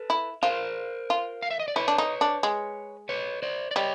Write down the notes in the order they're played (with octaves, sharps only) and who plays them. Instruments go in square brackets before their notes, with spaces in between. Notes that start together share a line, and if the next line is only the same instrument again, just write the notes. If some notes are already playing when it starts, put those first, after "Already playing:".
Already playing: [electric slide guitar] A4 B4
[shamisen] E4
[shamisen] F4 [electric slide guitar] A#4 C5
[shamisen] F4
[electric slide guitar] F5
E5
D#5
D5
[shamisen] E4 [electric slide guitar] B4 C#5
[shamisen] D4
D#4
D4
G#3
[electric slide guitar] B4 C#5
C5 D5
D5
[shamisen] G3 [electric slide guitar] C#5 D#5